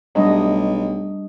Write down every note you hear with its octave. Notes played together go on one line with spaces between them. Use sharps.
B1 F#3 G3 A3 D4 D#5